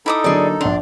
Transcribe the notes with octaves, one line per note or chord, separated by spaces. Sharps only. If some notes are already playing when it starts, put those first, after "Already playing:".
D#4 E4 A4 D6 D#6
D3 F#3 A#3 G#4 D5
A#1 D4 F#5 C6 F7